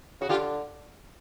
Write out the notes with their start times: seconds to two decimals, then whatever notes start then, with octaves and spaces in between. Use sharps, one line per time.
0.21 C#3 F#4
0.29 D3 F4 G4